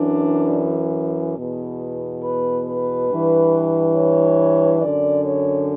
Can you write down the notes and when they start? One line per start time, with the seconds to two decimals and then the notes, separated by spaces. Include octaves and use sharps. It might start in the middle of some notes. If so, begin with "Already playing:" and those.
Already playing: F#2 E3 D4
1.37 E2 B2
2.23 B4
2.67 B4
3.09 G2 E3
3.96 C#5
4.82 F#2 D3 D5
5.26 C#5